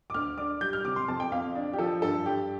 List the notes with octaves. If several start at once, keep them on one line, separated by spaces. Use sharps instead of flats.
D6
D2 F6
D4 D6
G3 G6
F6
C3 D6
C6
F2 A5
G5
F2 F5
D4
G4
F3 A4
G2 A4
G2 G4